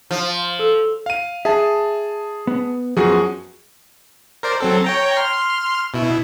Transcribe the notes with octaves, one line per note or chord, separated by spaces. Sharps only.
F3
A4 E6
F5 D#7
G#4 E5 A5
B3
F#2 F3 B3 F#4 G#4
A#4 C5 D5
F#3 C4 A4
C#5 G5 A#5
C6 F6
B2 E4